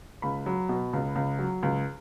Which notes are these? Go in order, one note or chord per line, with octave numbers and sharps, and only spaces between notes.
C#2 B5
F#3
B2
C#2
C#2
F#3
C#2